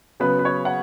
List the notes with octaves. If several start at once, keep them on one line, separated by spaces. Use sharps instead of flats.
C#3 F#3 B3 B4
B4
C#5
F#5